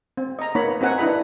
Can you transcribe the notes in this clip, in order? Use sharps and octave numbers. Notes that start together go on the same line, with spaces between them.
C4
D#5 A#5
A#3 B3 D#4 C#5 B5
C4 D#4 F#4 F#5 G#5
D4 E4 B4 D#5 B5